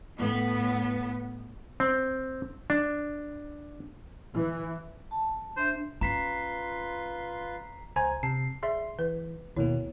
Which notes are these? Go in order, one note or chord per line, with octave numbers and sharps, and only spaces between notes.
A2 B3
C4
D4
E3
A5
D4 C5 E5
C#4 F4 B4 A#5 C6 B6 C7
C#2 C5 G#5 A#5
C3 A5 C7
G#4 D5 E5 C6
E3 B4
D#2 B2 A#3 E4 C#5